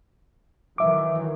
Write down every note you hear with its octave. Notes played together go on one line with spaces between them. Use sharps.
D#3 E3 F#3 E5 D6